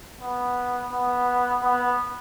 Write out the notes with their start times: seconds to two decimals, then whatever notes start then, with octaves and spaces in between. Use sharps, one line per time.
0.21 B3
0.92 B3
1.63 B3